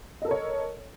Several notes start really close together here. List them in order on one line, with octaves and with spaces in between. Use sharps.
D#5 A4 A#4 C#5